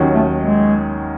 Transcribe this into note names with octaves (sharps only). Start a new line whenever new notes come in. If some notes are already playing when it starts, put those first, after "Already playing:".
Already playing: D#2 D#3 F#3 C#4
A3
G#3